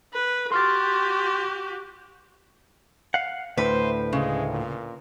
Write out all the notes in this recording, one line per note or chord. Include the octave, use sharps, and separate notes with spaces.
B4
F#4 G4 C6 F6 A6
F5 F#5
D2 A2 B4 C5
C#3 G#3
A#2